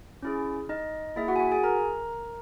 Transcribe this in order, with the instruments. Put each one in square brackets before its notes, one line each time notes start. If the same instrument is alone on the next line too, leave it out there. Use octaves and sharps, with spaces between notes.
[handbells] C#4 E4 G#4
D#4 D#5
A#3 E4 G#4 E5
F#4 F#5
G#5
F#4 F#5
G#4 G#5
A#4 A#5